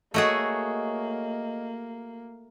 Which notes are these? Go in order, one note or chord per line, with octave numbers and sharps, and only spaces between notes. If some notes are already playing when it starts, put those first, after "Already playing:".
A3 A#3 F#4 G#4 C#5 D#5 E5